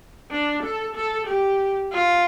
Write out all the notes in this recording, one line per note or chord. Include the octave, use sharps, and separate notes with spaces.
D4
A4
A4
G4
F4